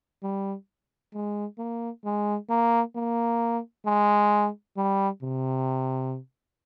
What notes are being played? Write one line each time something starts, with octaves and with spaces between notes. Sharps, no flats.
G3
G#3
A#3
G#3
A#3
A#3
G#3
G3
C3